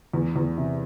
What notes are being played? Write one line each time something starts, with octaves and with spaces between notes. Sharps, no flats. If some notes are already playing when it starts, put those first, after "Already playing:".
E2
E2
C3